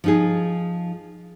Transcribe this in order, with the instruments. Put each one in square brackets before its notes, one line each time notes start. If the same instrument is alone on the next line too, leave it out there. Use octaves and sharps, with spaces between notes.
[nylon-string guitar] F3 D#4 G#4